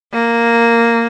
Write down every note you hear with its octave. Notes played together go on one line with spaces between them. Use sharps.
A#3